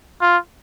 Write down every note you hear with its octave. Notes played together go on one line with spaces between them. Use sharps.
F4